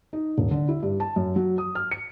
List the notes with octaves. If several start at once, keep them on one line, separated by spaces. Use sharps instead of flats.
D#4
D#1
D3
E4
G2
A5
F#2
F#3
D#6
F6
C#7